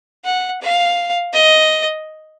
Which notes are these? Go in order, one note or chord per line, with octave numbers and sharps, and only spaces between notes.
F#5
F5
D#5